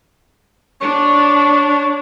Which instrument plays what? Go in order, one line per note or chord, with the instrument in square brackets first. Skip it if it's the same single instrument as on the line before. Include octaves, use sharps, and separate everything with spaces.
[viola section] D4 [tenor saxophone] C#5